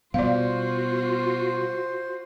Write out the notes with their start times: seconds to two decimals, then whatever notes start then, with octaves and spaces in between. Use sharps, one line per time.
0.14 B2 G3 B3 F4 F#4 C5 D5 F5